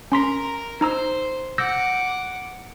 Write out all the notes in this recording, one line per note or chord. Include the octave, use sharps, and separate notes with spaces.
C#4 A#4 A#5 C6 B6
D#4 C5 A#5 E6
F#5 D6 E6 G6 A#6